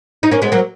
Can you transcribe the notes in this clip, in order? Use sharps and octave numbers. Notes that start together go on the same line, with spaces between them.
D#4
A#3 C#4
G#3 B3
F#3 A#3